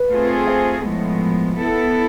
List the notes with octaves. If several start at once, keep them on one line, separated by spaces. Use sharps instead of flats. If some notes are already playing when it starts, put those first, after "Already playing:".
Already playing: B4
A3 C4 F4 G#4
C5
A2 F3 G#3 B3
B3 E4 A4